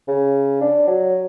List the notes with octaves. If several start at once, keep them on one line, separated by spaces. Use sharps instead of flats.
C#3
D4
F#3